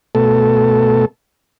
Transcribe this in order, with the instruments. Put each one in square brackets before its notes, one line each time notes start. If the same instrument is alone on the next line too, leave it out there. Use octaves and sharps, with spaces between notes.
[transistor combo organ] B2 A3 A4